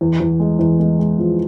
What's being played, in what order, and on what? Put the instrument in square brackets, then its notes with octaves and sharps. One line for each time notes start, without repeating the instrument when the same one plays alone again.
[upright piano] E2
E2
G#3
E2
G#3
G#3
F3